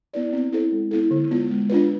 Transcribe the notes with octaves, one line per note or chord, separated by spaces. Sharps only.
B3 E4 B4 D5
C4
E4 A4 C5
G#3
B3 E4 A4
D3
G#3 B3 F4
G#3
D4 F4 B4